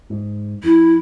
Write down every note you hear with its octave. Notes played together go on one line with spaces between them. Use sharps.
G#2
F2 E4